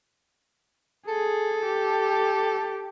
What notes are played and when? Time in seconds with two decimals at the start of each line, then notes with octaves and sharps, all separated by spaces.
1.08 G#4 A4
1.66 G4